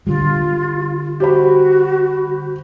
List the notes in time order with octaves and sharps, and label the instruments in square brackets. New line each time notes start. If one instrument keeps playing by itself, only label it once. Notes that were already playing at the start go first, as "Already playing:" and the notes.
[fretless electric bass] D3 G3 [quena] F4
[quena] F#4 [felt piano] G4 C5 B5